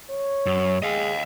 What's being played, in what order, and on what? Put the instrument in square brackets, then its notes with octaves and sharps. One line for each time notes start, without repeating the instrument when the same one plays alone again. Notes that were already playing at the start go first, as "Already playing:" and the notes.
[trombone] C#5
[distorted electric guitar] F#2
[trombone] G#3 [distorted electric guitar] D#5 F5